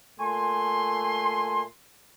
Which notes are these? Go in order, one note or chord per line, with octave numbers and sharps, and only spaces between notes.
A#2 A3 G#5 C6